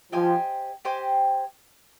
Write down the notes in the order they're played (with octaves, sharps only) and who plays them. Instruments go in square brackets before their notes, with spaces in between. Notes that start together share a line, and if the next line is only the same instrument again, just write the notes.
[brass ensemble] F3 [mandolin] G4 C5 D#5 G#5
[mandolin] G4 C5 D#5 G#5